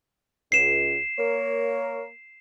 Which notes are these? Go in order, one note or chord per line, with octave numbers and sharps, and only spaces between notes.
C#2 C7 E7
A#3 A#4 C#5